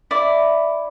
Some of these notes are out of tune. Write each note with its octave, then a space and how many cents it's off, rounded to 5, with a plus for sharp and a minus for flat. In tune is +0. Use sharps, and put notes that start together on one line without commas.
E4 +0 D5 +0